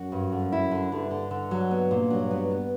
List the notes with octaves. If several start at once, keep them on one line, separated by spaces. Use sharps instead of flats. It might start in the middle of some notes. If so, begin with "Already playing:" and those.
Already playing: F#2 F#4
G2
D3
E4
D3
G2 D3
D3
D3
F#3
B3
A#2
G2 F#3
B3
B3